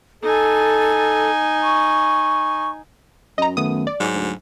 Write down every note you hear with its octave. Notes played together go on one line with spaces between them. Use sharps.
D#4 A4 G#5
C#6
F#2 D#5 A#5
D#3 A3 B3 D#6
D5
G#2 F#3
D2